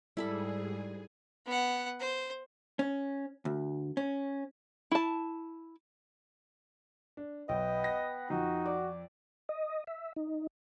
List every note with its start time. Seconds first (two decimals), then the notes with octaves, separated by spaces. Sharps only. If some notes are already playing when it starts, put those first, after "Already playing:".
0.17 G#2 G3 E4 G#4 A4 B5
1.46 B3 F#5
2.00 C5
2.79 C#4
3.45 D2
3.97 C#4
4.91 E4 A5
7.17 D4
7.49 B1 B3 B4 D#5 F#5 G5
7.84 A#6
8.30 F2 D#4 F#4
8.66 D5
9.49 D#5
9.87 E5
10.16 D#4